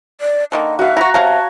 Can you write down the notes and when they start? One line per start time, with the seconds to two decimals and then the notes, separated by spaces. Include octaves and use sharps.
0.21 D5
0.52 D3 D#3 A#3 D#5
0.79 F#4 E5 F5
0.97 E4 F#4 A#5
1.14 C3 C#5 F5 A5 A#5